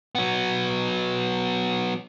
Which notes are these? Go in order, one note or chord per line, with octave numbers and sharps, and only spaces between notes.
F#3 B3